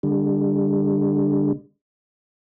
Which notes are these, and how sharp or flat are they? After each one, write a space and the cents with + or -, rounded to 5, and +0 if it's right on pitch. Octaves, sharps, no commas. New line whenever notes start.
D3 +0 G3 +30